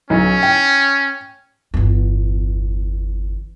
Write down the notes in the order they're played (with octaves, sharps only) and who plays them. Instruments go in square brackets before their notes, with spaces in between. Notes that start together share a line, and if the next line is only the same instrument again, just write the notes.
[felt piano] B1 [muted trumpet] C#4
[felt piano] G5
[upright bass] G1 E2